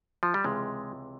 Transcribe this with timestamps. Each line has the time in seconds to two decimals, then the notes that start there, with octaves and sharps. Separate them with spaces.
0.23 F3
0.34 G3
0.44 C#2 C3 E3 G#3